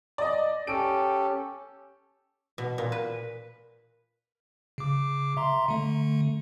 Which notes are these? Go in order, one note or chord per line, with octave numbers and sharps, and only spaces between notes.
D5 D#5
C#4 G4 A4 D7
B2
A#2
B4
C#3 D6
E5 A#5 C6
D3 A3